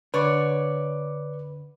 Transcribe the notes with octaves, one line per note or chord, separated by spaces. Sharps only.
D3 B4 C#5 D5